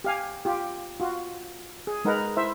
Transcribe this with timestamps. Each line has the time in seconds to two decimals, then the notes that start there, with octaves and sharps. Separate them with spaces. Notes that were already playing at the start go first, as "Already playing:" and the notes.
0.04 G4 F5 G#5
0.45 F4 G4
1.00 F4 F#4
1.87 G#4
2.05 G#3 D#4 A#4 B4 F#5
2.37 E4 C5 E5